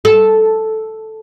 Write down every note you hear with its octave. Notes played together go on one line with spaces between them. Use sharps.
A4